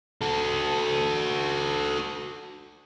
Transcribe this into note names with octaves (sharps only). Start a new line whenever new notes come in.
F#4 A4